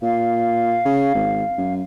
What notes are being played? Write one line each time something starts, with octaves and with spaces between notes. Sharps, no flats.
A#2 F5
C#3
G#1
F#2